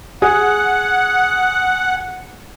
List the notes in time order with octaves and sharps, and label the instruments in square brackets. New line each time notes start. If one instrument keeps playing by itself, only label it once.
[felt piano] G#4 [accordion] F#5